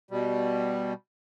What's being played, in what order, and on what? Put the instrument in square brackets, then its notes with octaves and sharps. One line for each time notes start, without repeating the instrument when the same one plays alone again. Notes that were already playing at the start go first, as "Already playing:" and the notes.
[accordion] B2 G3